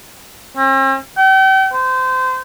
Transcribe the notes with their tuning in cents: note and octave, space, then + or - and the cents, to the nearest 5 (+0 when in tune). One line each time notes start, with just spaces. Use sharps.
C4 +45
G5 -40
C5 -25